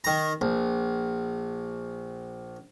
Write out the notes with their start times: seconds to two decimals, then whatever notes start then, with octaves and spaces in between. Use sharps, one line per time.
0.04 D#3 A#5
0.41 A#1